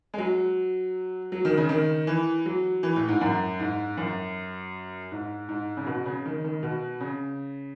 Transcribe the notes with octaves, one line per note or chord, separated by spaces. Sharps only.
G#3
F#3
F#3
D#3
C#3
D#3
E3
F#3
E3
A2
G#2
F#2
G#2
F#2
G#2
G#2
C#3
B2
C#3
D#3
D#3
B2
C#3